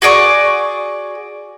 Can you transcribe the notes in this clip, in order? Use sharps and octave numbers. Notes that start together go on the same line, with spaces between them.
F#4 G#4 D5 C#6